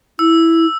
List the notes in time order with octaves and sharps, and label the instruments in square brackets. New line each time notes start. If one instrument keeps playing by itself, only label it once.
[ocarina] E4 [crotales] E6